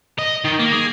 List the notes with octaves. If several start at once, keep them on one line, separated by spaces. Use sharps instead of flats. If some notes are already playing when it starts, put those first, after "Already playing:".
D#5
D#3
A#3
G#4